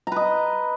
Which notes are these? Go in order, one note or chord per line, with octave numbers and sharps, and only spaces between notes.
B4 D#5 A#5